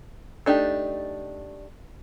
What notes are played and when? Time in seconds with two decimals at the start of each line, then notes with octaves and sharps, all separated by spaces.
0.46 A3 D4 D#4 G4